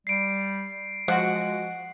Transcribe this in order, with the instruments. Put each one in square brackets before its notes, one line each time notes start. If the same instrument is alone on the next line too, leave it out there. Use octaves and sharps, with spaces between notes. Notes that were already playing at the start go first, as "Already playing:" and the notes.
[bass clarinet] G3 [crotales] C7 D7
[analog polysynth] F3 F#4 [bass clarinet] G#3 [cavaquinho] F#5